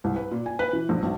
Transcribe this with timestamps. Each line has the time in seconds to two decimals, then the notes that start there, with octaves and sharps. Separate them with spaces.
0.04 C2
0.16 B4
0.31 A#2
0.46 G#5
0.59 B4
0.73 E3
0.89 A#1
1.03 B1